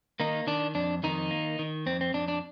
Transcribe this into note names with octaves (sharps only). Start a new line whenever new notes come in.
D#3 A#3 D#4
D#3 D4
F2 D4
F2 D#3 D#4
A#3
D#3
F2 C4
C4
F2 D4
D4